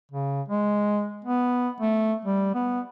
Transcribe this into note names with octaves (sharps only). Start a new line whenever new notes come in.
C#3
G#3
B3
A3
G3
B3